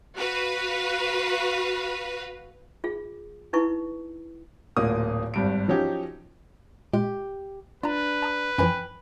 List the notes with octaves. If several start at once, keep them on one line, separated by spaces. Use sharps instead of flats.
F#4 B4 F5
F4 G#4
D#4 E4 B4 C#6
D1 D2 A#2 A#3 D#6
G#1 G2 D7
F3 F#3 C#4 D#4 G4
A#2 G#3 G4
D4 F4 B4 A#5
A5 A#5 D#6
F#2 E3 F3 G5 G#5 B5